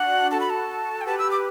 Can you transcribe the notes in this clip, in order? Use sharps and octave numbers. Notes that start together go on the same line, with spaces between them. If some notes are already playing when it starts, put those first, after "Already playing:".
Already playing: D4 F#4 F#5
F#4 A4 A5
B5
A5
G5
G4 B4 A5
E6
D6